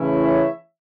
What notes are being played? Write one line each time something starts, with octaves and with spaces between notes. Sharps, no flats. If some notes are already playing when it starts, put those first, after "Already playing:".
Already playing: C#3 E3 A3 C#4 E4
C#5 E5